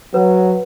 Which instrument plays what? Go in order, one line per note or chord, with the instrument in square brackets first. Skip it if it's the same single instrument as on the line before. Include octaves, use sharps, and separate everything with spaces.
[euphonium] F#3 [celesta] B4